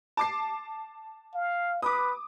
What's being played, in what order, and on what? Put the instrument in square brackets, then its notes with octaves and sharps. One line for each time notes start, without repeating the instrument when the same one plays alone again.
[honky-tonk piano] A5 D6 C7
[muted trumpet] F5
[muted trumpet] B4 [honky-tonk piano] D6 D#6